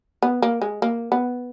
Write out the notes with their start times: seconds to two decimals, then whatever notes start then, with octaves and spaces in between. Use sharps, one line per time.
0.22 B3
0.42 A#3
0.62 G#3
0.82 A#3
1.12 B3